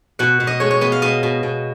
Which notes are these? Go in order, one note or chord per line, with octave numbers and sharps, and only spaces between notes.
B2 F#5
B2
D#5
G#3 C#5
C#5
B3 D#5
F5
B2 D#5
B2
B2